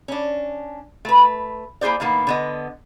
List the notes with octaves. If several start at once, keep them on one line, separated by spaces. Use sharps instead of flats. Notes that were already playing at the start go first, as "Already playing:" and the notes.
C#4 D4
A3 B4
A#3 E4 G#4 C5 D5
A2 D#3 A#3 B3
D3 B3 D#5